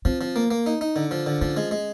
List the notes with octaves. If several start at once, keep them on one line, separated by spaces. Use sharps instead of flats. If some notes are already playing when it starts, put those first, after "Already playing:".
F3 C4
F3
A#3
A#3
D#4
D#4
D3
F3
D3
F3 C#4
G#3
G#3